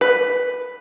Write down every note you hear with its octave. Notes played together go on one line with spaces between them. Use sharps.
B4